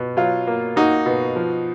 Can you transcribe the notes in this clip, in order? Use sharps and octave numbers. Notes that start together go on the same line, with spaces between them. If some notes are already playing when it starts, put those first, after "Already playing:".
Already playing: B2
F#3 F4
A#3
A#3 D#4 F#4
B2
F3